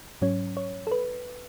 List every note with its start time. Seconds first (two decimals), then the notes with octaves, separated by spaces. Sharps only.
0.22 G#2 F#3 C#4 C#5
0.57 C#5
0.87 A4
0.92 B4